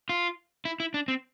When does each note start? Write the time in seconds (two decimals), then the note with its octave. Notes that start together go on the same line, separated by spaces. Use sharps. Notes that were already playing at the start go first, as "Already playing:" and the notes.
0.09 F4
0.65 E4
0.80 E4
0.94 D4
1.08 C4